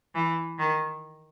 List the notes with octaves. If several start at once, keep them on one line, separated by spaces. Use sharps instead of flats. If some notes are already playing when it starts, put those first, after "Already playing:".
E3
D#3